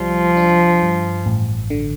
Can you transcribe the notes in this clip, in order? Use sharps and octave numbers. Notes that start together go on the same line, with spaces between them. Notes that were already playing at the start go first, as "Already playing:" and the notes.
Already playing: C2 C3 F3 G3
D4
G2
A1
D3